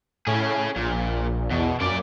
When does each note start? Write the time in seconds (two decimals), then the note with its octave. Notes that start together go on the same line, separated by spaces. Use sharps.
0.27 A2 C#4 G#4
0.76 A#1 A#2
1.51 E2 B2
1.81 F#2 A#3 D5